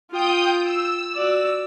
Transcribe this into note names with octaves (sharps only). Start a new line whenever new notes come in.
F4 G5 D#6 G6
E6
F#4 D5